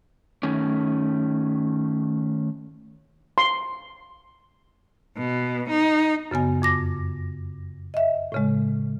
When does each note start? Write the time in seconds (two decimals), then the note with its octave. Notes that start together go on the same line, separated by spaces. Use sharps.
0.43 D#3 A3 C#4
3.38 C6
5.17 B2
5.70 D#4
6.31 F#2 C#3 B3 G#5
6.62 F2 D6 A#6
7.94 D#5 E5
8.32 A2 C#3 G#3